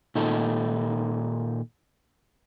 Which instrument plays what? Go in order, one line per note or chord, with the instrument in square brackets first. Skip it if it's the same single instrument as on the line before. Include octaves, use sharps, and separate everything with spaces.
[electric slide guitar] A#2 D#3 D#4 A4